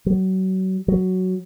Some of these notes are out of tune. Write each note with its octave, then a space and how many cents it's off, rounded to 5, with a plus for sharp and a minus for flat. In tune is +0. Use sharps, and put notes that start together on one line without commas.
F#3 +30
F#3 +0